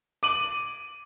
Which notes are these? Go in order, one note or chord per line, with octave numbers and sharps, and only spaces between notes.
D6 D#7 F#7